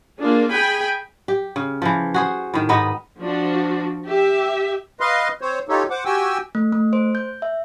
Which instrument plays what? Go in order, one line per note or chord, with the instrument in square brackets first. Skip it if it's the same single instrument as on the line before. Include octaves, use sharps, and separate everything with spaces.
[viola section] A#3 D4 F4 G#4
G#4 G5 G#5 B5
[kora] G4
C#3
E3 F3
F#4 G#4 C5
A2 D#3
G#2 B3 D#4 D#5
[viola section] F3 D4 F#4
G4 E5
[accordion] B4 D#5 F5 C6
C4 C5 C#5
D#4 F4 G4 A4 C#5
C5 F#5 D6
F#4 G4 G5 G#5 E6
[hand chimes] A3
A3
C5
G6
E5